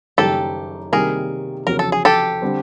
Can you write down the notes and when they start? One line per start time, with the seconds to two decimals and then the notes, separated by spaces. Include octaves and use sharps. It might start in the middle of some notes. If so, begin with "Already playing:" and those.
0.18 F#1 F#2 D#3 G3 G4 A4
0.92 C3 D#3 G3 A#3 G#4 A#4
1.67 F1 E2 C#3 F#3 A#4
1.79 A4
1.92 G#4
2.05 G4 A4
2.42 D3 G3 C4